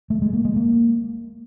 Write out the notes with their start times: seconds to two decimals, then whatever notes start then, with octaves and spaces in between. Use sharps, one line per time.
0.10 A3
0.22 G#3
0.33 A#3
0.45 G#3
0.56 A#3